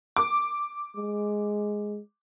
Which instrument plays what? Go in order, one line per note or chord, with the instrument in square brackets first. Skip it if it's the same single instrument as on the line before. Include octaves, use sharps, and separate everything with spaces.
[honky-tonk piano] D6
[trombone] G#3